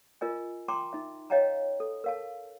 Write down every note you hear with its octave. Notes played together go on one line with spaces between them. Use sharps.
F4 A#4 D#5 G#5
G5 A5 A#5 C6 D6
D#4 E5
C#5 D#5 F5 G5 A5 A#5
A4
A#4 F5 A5